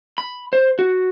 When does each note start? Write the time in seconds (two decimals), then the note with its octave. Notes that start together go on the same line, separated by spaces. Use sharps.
0.18 B5
0.53 C5
0.79 F#4